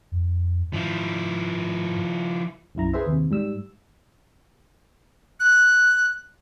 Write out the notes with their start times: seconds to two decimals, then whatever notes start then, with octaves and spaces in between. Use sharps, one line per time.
0.12 F2
0.73 G#2 F3 E4
2.75 B1 F#2 E4 A#5
2.93 G#4 B4 C5 E5
3.07 D#2 C3
3.31 G#2 G3 E6
5.40 F#6